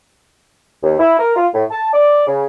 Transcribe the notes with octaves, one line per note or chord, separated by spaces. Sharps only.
D#2
E4
A#4
F4
A2
A5
D5
C#3